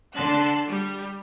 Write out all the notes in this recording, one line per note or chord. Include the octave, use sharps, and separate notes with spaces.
D3 A5 C6 F#6
G3